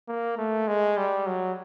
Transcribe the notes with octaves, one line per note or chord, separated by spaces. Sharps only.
A#3
A3
G#3
G3
F#3